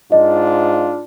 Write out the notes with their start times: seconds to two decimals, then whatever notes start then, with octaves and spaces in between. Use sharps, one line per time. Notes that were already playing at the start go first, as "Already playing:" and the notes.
0.12 G#2 D4 F4 D#5